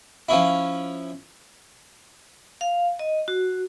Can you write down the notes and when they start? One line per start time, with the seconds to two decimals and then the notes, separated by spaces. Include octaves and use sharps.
0.29 F3 C#4 E4
2.61 F5
2.99 D#5
3.28 F#4